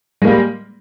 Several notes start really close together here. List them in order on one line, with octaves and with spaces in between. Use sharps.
G#3 A#3 G3